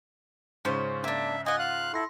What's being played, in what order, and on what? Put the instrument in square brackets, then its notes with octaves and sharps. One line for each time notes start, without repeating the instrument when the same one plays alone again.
[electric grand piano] G#2 C#3 [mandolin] C#4 F4 C5
[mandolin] A#3 D4 [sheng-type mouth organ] E5
[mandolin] F4 F#5 [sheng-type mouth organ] D#5 G#5
[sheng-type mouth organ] F5 F#6
[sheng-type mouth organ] E4 A4 [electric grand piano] C6 A#6